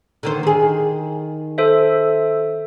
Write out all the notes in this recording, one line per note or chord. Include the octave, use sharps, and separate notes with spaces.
D3 D#3 C5
D#3 G#4
A4 C5 E5